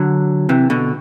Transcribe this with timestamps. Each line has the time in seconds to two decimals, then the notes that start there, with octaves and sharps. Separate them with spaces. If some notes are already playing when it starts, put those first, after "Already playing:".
Already playing: D3 F#3
0.49 C3 E3
0.70 B2 D3